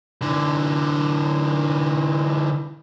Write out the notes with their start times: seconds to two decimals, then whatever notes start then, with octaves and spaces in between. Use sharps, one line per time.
0.22 D3 E3